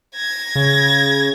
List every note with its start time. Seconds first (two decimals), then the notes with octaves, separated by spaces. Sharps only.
0.16 G#6 A#6
0.55 C#3